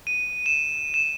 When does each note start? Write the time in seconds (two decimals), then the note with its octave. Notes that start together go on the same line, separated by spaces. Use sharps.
0.07 D#7
0.46 E7
0.94 E7